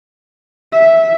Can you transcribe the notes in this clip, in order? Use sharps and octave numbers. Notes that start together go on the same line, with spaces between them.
E5